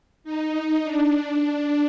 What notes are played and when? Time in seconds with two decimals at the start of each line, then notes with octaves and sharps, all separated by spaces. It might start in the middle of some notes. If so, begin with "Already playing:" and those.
0.24 D#4
0.54 D#4
0.83 D4